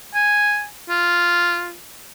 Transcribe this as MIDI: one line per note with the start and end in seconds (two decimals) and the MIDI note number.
0.15 0.66 80
0.89 1.75 65